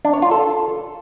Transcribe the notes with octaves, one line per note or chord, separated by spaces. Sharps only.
D4
C#5
F4
A4